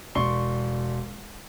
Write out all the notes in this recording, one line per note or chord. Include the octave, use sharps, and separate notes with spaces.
E1 D5 C6 C#6 C7 G7